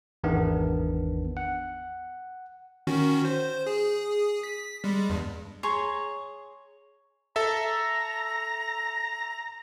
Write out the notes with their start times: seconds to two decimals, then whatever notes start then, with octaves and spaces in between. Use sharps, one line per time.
0.24 G#1 E2 D#3 B3 D4
1.37 F#5
2.87 D#3 C#4 F#4
3.25 C5
3.66 G#4
4.43 B6
4.84 G3 G#3
5.10 E2 G2
5.63 G#4 C#5 A#5 C6
7.36 A4 E5 A#5